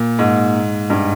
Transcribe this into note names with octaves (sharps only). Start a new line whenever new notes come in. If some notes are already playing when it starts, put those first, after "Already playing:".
Already playing: A#2
G#2
G2